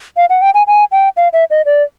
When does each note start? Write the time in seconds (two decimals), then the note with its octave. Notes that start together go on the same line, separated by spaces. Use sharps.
0.17 F5
0.30 F#5
0.42 G5
0.54 G#5
0.67 G#5
0.92 G5
1.17 F5
1.33 E5
1.50 D#5
1.66 D5